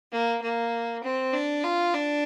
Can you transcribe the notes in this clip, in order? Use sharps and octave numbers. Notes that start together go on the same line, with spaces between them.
A#3
A#3
C4
D4
F4
D4